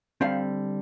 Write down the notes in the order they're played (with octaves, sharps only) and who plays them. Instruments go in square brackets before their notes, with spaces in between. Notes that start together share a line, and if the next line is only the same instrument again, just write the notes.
[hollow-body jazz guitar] D3 G3 C4 F5